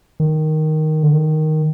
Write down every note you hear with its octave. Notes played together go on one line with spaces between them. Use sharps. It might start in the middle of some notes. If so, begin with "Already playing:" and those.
D#3
D3
D#3